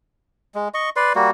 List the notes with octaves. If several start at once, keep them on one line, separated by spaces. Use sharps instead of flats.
G#3
D#5 C#6
B4 D5 C6
G3 A#3 F#4